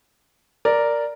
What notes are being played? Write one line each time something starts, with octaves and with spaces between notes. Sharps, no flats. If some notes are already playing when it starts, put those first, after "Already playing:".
A#4 D5